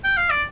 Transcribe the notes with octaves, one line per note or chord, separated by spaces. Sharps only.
G5
F5
D5